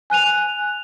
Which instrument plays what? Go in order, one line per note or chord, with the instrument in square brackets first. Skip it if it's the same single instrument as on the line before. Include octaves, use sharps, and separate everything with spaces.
[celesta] G#5 F#6 D#7 F7